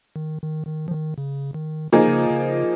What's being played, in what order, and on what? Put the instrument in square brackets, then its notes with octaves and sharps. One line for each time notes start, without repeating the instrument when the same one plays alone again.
[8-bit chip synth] D#3
D#3
D#3
F3
D#3
C#3
D#3
[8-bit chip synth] C#3 [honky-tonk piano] F3 A#3 D#4 G#4
[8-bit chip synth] C#3
C#3